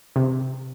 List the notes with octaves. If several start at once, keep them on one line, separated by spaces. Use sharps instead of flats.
C3